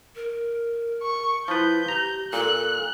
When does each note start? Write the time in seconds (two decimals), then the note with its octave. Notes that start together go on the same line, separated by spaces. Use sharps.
0.16 A#4
1.03 C#6
1.48 F3 E4 B4 G6
1.88 G4 A#5
2.33 A#2 A4 F#6